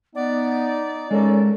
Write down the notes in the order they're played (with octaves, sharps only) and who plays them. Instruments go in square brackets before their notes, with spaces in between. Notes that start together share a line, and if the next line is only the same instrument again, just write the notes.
[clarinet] B3 [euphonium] D#4 [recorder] D5
[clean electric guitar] G#3 A#4 [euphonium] C#4 [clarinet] A4